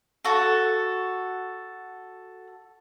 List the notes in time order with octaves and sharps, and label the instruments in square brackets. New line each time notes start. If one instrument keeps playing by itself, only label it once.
[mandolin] F#4 A4